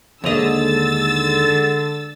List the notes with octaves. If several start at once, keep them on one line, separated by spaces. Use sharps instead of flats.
D#2 D3 G#3 D4 G#4 D#5 E6 A6